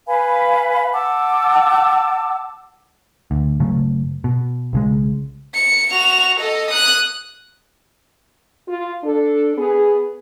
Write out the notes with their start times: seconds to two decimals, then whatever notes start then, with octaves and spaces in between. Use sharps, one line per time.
0.07 B4 F5 G#5 B5
0.93 F#5 A5 D6 E6
3.31 D2
3.60 F#1 C#3 F#3 A3
4.24 B2
4.73 B1 C#3 G#3
5.55 C#7
5.92 F#4 F7
6.40 A4 D#5
6.71 D#6 F#6
8.68 F4
9.03 D4 A4
9.57 B3 G#4